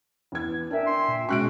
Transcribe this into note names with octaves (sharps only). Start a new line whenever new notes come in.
E2 G#6
D4 A#4 E5 G5 G#5
C6
A#2
B2 G#3 C#4 F#4 C#6 F#6 D7